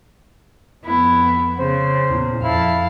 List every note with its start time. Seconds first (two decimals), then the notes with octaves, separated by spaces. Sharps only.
0.84 F2 B3 E4
1.59 C#3 C5
2.08 E2 A#2
2.44 F2 E4 F5 A5